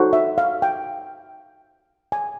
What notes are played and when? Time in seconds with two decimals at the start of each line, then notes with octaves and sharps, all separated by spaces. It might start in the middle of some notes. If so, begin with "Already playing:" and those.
Already playing: D#4 F#4 A4 C5
0.13 E5
0.38 F5
0.62 G5
2.12 G#5